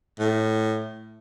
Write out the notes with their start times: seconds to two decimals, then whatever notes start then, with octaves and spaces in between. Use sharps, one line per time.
0.19 A2